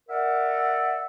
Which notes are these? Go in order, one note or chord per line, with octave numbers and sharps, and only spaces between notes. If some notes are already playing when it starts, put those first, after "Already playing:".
A#4 D5 E5 F#5